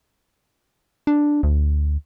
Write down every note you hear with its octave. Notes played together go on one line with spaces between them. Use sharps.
D4
D2